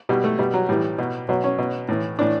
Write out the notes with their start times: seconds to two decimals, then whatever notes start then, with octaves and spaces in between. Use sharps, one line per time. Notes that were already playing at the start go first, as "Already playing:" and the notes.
0.09 B2 G3
0.24 A3
0.39 B2 G3
0.54 F#3
0.69 A2 E3 G3
0.98 B2
1.29 B2 F#3
1.44 C#4
1.58 B2
1.88 A2 E3
2.19 A2 E3 D4